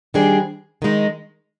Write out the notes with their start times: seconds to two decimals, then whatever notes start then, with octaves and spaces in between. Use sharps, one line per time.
0.14 D#3 G3 D4 G#4 C5
0.82 D#3 G#3 D#4